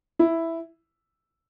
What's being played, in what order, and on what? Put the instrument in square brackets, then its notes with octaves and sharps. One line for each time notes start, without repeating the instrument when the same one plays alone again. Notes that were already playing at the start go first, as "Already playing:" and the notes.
[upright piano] E4